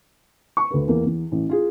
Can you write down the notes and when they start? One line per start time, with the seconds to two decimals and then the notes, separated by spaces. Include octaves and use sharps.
0.57 C#6
0.71 D2 B4
0.88 E2 A#3
1.05 E2
1.32 A1
1.49 F4 G#4